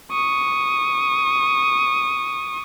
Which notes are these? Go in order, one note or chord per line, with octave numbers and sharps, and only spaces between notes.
C#6 D#6